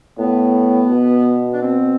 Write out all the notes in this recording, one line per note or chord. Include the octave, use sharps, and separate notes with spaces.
A2 B3
B2
D4
C4